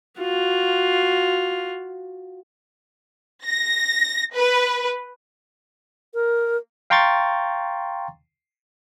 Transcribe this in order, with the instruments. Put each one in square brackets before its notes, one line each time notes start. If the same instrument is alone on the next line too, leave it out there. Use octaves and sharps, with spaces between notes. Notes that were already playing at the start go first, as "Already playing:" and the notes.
[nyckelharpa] F4 F#4
[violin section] A#6
B4
[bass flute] A#4
[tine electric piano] F5 G5 A#5 C6 C#6 A6